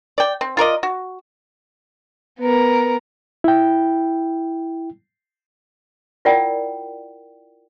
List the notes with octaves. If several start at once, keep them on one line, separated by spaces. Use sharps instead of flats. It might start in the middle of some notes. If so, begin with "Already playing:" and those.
D5 G5
C4
F4 A#4 D5 D#5
F#4
B3 A#4
E4 G5
E4 F4 A#4 D5 F#5 G5